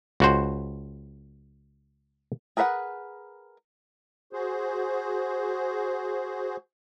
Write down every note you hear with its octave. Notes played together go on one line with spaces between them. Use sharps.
C#2 F#4 C5
G#4 A#4 B4 E5 F#5
F#4 G#4 C5